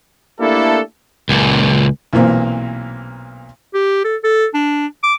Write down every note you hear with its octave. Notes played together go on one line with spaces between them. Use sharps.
A3 A#3 D4 E4 G4 A4
C#2 A#2
B1 A#2 E3 A#3 C4
G4
A4
A4
D4
D6